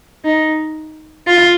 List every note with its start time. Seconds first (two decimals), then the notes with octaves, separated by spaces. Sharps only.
0.24 D#4
1.27 F4